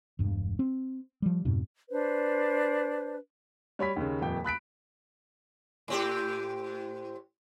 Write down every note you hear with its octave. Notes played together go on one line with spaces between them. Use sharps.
E1 G2
C4
F3 G3
F2 G#2 B2
D4 B4 C5
G3 C#5 B5 B6
D#2 C#3
D#1 F2 G5
B5 F#6 B6 D7
A2 C4 G4